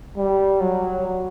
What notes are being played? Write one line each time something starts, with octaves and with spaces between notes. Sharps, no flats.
G3
F#3